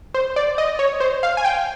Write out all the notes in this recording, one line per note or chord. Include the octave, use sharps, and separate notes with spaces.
C5
D5
D#5
C#5
C5
F5
G#5
G5